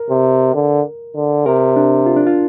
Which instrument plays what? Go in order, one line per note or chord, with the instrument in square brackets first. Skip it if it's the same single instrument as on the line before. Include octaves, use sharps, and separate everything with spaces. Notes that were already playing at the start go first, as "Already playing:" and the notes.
Already playing: [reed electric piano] A#4
[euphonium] C3
D3
D3
[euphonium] C3 [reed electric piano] A#4
[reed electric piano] D4
F4
D4
F4